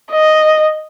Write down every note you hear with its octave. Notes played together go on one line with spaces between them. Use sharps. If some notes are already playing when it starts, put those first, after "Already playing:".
D#5